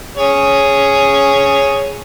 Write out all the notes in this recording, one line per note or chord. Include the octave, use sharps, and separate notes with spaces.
G#4 C#5